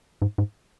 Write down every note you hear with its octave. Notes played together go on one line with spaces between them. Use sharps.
G#2
G#2